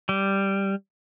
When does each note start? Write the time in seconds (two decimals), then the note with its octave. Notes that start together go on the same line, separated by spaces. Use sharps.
0.09 G3